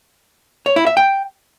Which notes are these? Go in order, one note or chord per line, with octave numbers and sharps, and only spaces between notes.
C#5
E4
E5
G5